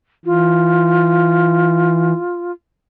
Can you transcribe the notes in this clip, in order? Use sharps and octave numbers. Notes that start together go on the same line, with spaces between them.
E3 F4